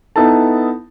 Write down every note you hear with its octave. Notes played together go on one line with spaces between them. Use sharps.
B3 D#4 E4 A4 A5